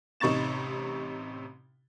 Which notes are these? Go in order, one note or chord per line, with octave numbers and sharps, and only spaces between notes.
A1 C3 D#4 C#6 A6 E7